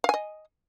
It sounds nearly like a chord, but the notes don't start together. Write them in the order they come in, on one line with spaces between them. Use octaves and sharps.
F5 G#5 D#5